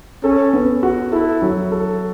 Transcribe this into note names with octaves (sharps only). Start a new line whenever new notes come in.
C#4 A4
B3
F#4
E4 A4
F#3
A4